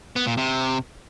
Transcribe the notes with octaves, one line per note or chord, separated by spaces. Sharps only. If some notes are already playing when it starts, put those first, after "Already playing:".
B3
A#2
C3